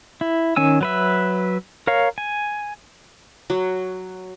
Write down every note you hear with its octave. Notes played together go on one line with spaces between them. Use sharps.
E4
D#3 C#4 G#5 E6
F#3 B4 E5
A#4 C#5 F5
G#5
F#3